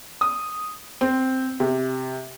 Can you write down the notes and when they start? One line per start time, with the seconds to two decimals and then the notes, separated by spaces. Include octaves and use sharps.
0.21 D#6
1.01 C4
1.60 C3